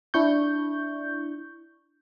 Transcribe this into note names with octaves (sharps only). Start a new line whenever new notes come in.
D4 E4 C#6 G6